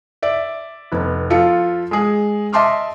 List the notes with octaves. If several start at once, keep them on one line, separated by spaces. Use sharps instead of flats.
D5 E5
F1 B3
F3 F4 A4 C#7
G#3 G#4
D#5 E5 A5 C6 D6 F6